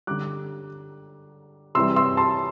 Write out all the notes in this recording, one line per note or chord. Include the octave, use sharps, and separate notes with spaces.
D3 G3 D6 F#6
C3 E3 G3 C6 E6
C6 E6
A5 C6